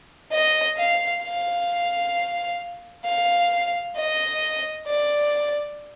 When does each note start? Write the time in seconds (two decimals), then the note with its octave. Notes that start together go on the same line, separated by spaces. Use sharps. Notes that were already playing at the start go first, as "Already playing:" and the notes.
0.32 D#5
0.77 F5
1.23 F5
3.05 F5
3.97 D#5
4.87 D5